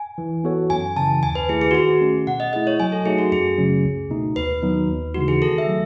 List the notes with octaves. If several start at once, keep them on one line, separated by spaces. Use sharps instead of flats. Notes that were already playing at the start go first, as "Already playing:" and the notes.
Already playing: G#5
E3
B3 F#4 A4 C#5
F#2 G#5
C#3 E3 A5
D#2 G#5
B4
D#3 A3 E4 G#4 B4
G#4
F#4
D#3 G#4
A3 C#4
B2 F#5
D#5
A3 E4 G#4 D#5
C#5
F#3 G#5
A4
A3 D#4 F#4 G#4
F#4
F#2 G#4
C#3 F#3 A3 C#4
C#2
B2 A3 D#4
D#2 B4
D#3 F#3 B3 D#4
D#2
C#3 E3 G#3 D#4 F#4
G#4
D#3 A4
E5
F#3 A3